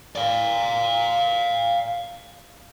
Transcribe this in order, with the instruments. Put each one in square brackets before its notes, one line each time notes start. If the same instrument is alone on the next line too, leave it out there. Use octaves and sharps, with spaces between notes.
[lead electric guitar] D5 F5